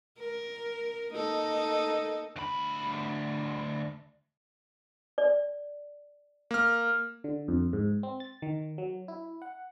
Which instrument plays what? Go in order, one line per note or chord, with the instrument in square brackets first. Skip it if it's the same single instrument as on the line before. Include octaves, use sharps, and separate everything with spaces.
[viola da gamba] A#4
A#3 D#4 A4
[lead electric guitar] D2 B5
[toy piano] D5
[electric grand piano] A#3 F6
[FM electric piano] D3
F2
G#2
C4
A6
D#3
F#3
E4
F#5